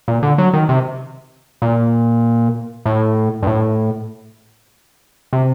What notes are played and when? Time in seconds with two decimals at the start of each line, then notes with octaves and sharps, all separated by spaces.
0.08 A#2
0.23 D3
0.38 F#3
0.53 D#3
0.69 C3
1.62 A#2
2.86 A2
3.43 G2
3.47 A2
5.33 C3